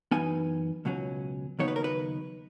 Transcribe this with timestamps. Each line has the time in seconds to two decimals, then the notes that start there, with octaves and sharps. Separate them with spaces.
0.11 F#2 E3 B3 D#4 G#5
0.85 C#2 B2 F#3 C#4
1.59 D#2 C#3 F#3 B3 D#4 C#5
1.68 B4
1.76 A#4
1.84 B4